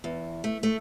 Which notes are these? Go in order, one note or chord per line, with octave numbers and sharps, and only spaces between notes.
E2
A3
A3